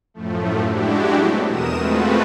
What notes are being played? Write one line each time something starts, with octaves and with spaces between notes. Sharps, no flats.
F#2 A2 F3 A3
G#3 D4 E4 F#4 G4
F#3 A3 B3 C4
E2 B2 A#4 D#6 E7
G#3 A3 C4 F4 F#4 B4